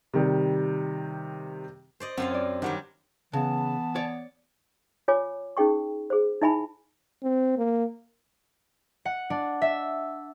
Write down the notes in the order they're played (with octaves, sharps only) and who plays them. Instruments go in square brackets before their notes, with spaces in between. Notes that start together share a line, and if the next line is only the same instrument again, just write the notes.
[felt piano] C3 D#3 G3
[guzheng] C5 D5 D#5
[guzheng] F#2 F4 F5 [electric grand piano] C4 [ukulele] F#5
[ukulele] C#5 D5
[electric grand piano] D#3 G4 [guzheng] F#3 G3 D4 [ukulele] C5 F#5
[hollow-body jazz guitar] C#3 [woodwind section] E3 B3 [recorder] A5
[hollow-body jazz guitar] C#5 D5
[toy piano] F4 C#5 G#5 D6
C#4 D#4 G#4 G5 C#6
G#4 C5
D#4 E4 E5 G#5 A5 B5
[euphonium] C4
A#3
[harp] F#5
D4
E5